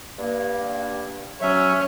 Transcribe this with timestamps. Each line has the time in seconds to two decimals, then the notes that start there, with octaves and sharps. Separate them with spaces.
0.19 G2 A#3
1.41 F#3 C#4 E5